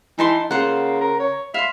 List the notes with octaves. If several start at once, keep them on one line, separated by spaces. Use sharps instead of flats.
E3 D#4 A5 C6
C#3 A#3 F4 C5 F#5
A#4
C#5
E5 F5 C6